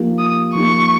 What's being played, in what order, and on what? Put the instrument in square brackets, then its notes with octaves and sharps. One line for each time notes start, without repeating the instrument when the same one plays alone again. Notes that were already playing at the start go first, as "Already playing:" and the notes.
Already playing: [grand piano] F3 A#3 D#4 G4
[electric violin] D#6
[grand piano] F3 A#3 D#4 G4 [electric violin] C#6